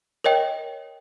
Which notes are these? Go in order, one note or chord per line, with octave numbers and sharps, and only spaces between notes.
A#4 C#5 D#5 G5